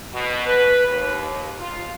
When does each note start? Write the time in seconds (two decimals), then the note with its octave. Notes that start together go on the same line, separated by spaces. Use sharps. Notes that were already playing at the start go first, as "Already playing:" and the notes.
0.13 B2
0.45 B4
0.88 D#2
1.59 F4